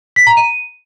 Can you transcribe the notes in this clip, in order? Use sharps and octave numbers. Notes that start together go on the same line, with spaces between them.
B6
A#5
D#7